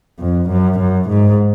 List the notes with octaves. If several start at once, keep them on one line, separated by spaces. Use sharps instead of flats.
F2
F#2
F#2
G#2